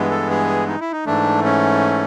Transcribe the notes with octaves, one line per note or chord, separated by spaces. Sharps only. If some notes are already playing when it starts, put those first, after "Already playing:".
Already playing: G2 E3 G#3 B3
A4
G#4
D#4
E4
D#4
G#2 E3 A3 D4
C#4